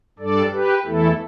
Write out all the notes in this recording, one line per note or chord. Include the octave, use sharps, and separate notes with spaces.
G2 G3 D4 A4 D5
G4 B4
E2 E3 A3 E4 A4